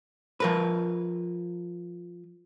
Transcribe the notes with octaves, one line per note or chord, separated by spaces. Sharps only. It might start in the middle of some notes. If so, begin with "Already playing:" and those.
F3 A#4 B4